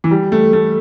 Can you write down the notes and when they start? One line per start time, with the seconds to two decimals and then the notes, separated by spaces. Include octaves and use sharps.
0.04 E3
0.11 G3
0.32 A3
0.53 A3